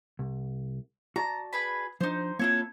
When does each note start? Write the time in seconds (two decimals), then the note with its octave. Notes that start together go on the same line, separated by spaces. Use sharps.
0.19 C2
1.16 F#4 D5 A5 A#5
1.53 G#4 B4 B5
2.01 F3 D4 D#4 C5
2.39 A#3 C4 E4 F4 A4 C#5